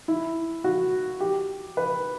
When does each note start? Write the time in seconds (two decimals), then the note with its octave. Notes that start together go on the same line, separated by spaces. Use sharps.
0.08 E4
0.64 F#4
1.20 G4
1.77 B4